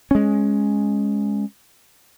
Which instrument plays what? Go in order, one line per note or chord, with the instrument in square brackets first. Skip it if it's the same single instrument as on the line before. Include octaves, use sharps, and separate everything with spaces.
[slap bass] G#3 C#4